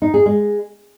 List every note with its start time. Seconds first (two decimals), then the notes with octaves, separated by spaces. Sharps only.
0.02 D#4
0.14 G#4
0.26 G#3